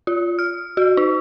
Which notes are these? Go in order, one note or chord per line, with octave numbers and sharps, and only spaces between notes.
F4
F6
F#4
D#4